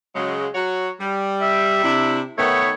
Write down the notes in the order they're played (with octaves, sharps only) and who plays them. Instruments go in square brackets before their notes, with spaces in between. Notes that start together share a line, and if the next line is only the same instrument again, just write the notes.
[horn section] C#3 F#3 G#3
F#3 F#4 C#5
G3
[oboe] E5
[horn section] C3 D4 E4
[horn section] D#3 A3 B3 [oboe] C#5